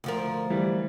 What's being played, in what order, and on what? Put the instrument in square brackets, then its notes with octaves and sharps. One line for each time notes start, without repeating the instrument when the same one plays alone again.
[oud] D2 F3 A#4
[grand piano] E3 G3